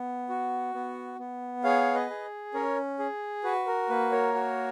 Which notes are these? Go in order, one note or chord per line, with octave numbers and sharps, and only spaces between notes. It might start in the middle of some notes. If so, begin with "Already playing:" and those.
Already playing: B3
F#4
B3
B3
G#4 C#5 F5
B4 D#5
G#4
C#4 A#4 C#5
G#4
F#4 B4
A#4
A#3 B4
A#4 C#5
F#4